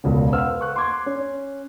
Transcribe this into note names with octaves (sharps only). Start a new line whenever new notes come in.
E1 C#2 C#3
B4 C5 F5 F#5 E6 F6
C#6 F#6
C6 D6 G#6
C#4